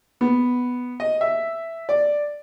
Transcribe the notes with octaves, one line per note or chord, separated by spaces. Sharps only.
B3
D#5
E5
D5